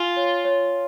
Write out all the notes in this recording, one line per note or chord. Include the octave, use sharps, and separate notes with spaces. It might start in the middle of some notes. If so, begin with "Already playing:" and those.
Already playing: F4 G#5
C#5
C#5